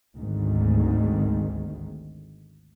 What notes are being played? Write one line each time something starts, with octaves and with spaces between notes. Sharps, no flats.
G#1 D2 G#2 D#3